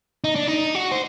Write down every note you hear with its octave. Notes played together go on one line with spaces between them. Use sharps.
D#4
D4
D#4
F#4
C5